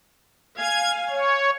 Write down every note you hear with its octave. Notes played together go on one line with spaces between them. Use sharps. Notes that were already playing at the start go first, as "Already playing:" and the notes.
F5 G#5 G#6
C#5